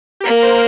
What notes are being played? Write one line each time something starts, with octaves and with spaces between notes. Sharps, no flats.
G4
A#3 A#4
C5